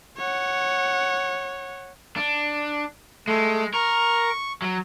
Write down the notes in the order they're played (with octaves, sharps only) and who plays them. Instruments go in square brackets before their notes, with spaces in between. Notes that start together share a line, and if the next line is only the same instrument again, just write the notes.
[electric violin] C#5 F#5
[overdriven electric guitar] D4
[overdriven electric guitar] G#3 [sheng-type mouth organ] A3
[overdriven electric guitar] A#4 [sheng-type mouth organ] C#6
[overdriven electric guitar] F#3